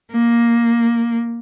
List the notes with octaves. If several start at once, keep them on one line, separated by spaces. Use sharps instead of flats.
A#3